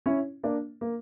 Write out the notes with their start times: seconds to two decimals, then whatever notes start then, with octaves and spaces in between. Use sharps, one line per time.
0.06 C#4 E4
0.43 A#3 D4
0.81 A#3